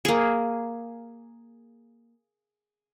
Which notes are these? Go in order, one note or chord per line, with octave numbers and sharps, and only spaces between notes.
A#3 G#4